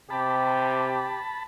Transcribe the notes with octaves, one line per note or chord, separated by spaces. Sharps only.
C3 G4 A5 B5